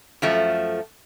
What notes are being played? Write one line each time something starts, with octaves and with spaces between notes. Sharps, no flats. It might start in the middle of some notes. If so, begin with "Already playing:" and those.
F#2 F3 A3